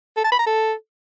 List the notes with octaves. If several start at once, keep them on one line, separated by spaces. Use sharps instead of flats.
A4
A5
B5
A#5
A4